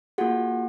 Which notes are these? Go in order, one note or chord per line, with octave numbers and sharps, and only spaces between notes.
A#3 F4 F#4 G#4 F#5